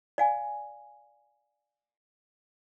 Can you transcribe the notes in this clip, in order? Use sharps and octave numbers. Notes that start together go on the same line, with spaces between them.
D5 F5 G#5